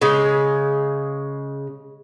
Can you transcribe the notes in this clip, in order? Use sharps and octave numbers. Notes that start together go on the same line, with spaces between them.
C#3 G#3